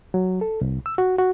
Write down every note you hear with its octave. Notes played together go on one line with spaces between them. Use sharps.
F#3
A4
C2
E6
F#4
F#4